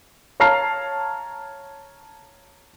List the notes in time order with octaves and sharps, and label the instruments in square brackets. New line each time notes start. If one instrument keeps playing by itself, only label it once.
[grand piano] C#5 F5 A5 A#5 F6 C7